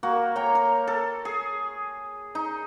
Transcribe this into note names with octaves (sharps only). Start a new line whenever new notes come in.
A#3 F#4
C#5 G5 A#5
A#4
A4
G#4
D#4